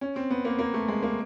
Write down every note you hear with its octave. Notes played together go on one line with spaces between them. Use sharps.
C#4
C4
B3
A#3
A#3
A3
G#3
A#3